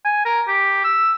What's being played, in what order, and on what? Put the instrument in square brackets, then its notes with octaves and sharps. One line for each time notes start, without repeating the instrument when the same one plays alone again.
[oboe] G#5
A#4
G4
E6